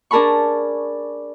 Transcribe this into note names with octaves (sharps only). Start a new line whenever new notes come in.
D4 G#4 A#4 A5 B5 C#6